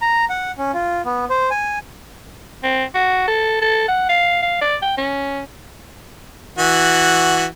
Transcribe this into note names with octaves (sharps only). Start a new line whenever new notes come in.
A#5
F#5
C#4
F4
B3
C5
G#5
C4
F#4
A4
A4
F#5
F5
F5
D5
G5
C#4
E3 F#4